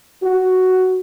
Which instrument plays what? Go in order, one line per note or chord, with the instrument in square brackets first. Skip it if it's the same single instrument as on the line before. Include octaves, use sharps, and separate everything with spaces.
[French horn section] F#4